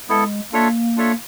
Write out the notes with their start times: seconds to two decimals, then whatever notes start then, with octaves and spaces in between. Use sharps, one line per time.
0.09 G#3 B3 E4 A4
0.52 A#3 D4 F4 A4 C#5 E5
0.97 D4 F4 A4 C#5 E5